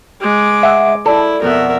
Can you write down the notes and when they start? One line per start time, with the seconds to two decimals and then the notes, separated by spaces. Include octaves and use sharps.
0.21 G#3 D6
0.63 E5 F#5
1.06 E4 A4 D5
1.42 F2 B2 A#4 E5 F#5